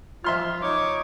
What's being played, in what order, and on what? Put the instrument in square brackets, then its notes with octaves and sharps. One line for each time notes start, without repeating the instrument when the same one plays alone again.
[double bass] F3 [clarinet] F4 [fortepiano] E5 C6 F6
[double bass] D#4 [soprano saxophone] C#5 [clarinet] D6